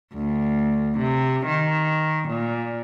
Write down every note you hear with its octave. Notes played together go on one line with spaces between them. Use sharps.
D2
C3
D#3
A#2